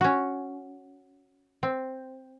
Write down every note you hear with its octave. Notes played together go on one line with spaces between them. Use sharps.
C#4 F#4
C4